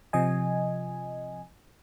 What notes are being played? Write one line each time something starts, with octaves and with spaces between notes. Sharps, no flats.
C3 F3 D#5 G#5